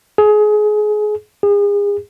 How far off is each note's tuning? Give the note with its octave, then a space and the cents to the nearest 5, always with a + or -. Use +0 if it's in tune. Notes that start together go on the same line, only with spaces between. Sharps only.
G#4 +25
G#4 -35